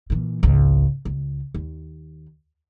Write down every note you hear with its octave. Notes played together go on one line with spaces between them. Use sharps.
A#2 E3
G#1 C#2
C#2
D#2